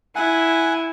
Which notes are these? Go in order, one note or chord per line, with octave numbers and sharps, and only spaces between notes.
E4 F#5 G#5